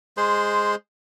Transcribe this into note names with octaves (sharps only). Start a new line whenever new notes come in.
G#3 G#4 C5 C6